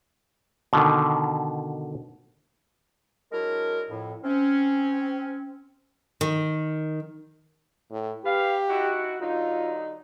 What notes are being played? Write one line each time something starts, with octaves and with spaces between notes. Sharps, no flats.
B2 D3 D#3
F#3 G#3 D4 E4 A#4
F2 A2
C4 C#4
D#3
A2
G4 B4 F5
D#4 E4 F#4
D3 F#3 D#4 F4